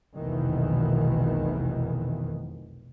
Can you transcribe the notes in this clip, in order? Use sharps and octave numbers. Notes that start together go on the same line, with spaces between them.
F1 B1 E2 B2 D#3 E3